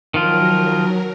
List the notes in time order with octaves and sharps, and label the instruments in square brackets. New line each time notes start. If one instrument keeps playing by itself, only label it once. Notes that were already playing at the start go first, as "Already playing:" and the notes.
[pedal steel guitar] D#3 F3 F4 [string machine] F#3 A#4